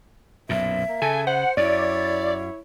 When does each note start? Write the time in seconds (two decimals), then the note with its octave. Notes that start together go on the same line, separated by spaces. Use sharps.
0.49 B1 F#2 A#2 E5
0.89 A#3
1.02 C#3 A4 G#5
1.27 C5 F#5
1.57 F#2 E4 C#5 D5